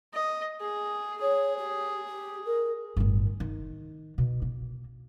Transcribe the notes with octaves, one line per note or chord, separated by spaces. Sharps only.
D#5
G#4
G#4 C#5
G4
G4
A#4
G1 A2
D#3
B2
A#3